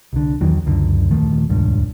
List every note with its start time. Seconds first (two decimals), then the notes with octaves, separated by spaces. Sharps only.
0.13 C2 D3
0.41 E2 D#3 E3 F#3
0.66 C#2 F#2 D3
1.11 D#1 D#3 F3 A3
1.50 D#1 C#2 G2